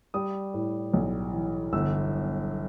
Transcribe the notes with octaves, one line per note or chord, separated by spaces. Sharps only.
G3 D#6
A2
B1
E3
G1 E6